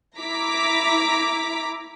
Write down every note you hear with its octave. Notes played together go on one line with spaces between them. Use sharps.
E4 A#5 D6 B6